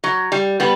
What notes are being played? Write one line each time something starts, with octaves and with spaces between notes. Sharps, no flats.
F#3
G3
G3 B3